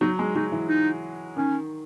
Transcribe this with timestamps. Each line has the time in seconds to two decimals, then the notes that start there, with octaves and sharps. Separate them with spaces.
0.01 F#3 D#4
0.19 G#3
0.35 F#3 D#4
0.52 E3
0.69 D#4
1.37 D#3 C#4